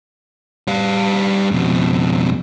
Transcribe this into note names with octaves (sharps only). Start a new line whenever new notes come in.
G3 F5
F2 B2